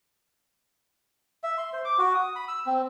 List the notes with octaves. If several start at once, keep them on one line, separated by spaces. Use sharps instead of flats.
E5
C6
C5
D6
F#4
D#6
B5
E6
C4